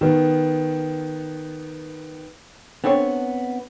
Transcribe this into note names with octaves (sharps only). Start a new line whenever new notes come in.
D#3 B3
B3 C4 D4 A4 C#5